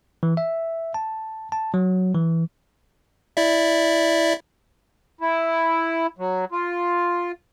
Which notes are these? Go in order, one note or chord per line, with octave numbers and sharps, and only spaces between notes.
E3
E5
A5
A5
F#3
E3
E4 D5 E5
E4
F#3
F4